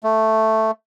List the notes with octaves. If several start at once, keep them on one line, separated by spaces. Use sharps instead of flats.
A3